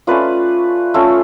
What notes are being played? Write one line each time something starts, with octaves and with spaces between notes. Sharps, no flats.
A3 C#4 F4 B4 D5
A3 C#4 F4 A4 C#5